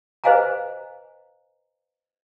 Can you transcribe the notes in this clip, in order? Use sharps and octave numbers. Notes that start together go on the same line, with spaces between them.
B4 C5 D#5 F5 G#5 A#5